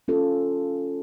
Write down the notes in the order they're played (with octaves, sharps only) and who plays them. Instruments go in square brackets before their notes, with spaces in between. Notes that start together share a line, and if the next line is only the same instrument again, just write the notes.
[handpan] C#4 F4 A4